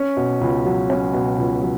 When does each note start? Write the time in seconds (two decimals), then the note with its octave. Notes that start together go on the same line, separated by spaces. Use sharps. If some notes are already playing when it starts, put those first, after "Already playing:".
Already playing: C#4
0.17 B2
0.41 C#2
0.65 F#3
0.90 C#4
1.14 B2
1.38 C#2
1.62 F#3